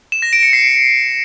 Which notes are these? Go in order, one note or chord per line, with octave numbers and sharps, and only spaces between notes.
E7
A#6
D7
C#7
C7